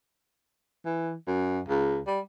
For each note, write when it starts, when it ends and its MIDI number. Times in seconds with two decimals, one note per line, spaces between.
0.85 1.14 52
1.28 1.60 42
1.69 1.99 37
2.07 2.20 55